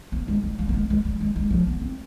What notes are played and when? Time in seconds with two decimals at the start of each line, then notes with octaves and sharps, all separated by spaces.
0.12 B3
0.28 G#3
0.43 G3
0.59 G3
0.69 B3
0.74 G#3
0.90 G#3
1.05 G3
1.20 G#3
1.36 G#3
1.50 F3
1.67 B3
1.81 C4